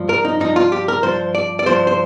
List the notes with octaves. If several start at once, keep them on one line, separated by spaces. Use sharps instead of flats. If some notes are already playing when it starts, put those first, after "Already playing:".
Already playing: G2 F3
A#4
D#4
G2 F3 D#4
F4
G4
A#4
G2 F3 C5
D5
D5
G2 F3 C5
C5